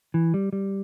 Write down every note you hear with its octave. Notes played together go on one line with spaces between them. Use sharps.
E3
G3
G3